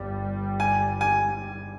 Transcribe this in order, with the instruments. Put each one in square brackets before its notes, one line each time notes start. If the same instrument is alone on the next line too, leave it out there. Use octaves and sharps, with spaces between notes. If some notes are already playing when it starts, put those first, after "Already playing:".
Already playing: [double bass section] G1 G2 G3
[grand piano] G#5
G#5